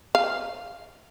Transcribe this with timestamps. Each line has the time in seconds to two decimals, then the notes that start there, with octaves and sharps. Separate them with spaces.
0.15 F5